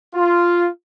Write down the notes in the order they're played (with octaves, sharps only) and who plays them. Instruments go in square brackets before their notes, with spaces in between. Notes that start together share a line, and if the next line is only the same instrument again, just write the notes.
[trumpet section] F4